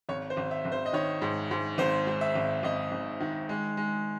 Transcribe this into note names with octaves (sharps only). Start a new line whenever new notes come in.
G#1 C#5
C5
G#1
E5
G#1
C5
D#5
D#3 C#5
G#2
G#2
G#1 C5
G#2
E5
G#1
G#1 D#5
G#1
D#3
G#3
G#3